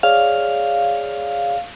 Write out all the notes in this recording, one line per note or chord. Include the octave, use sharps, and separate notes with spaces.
G#4 C#5 D5 F5